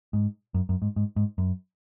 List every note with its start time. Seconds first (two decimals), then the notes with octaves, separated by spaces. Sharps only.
0.13 G#2
0.54 F#2
0.69 F#2
0.82 G#2
0.96 G#2
1.16 G#2
1.38 F#2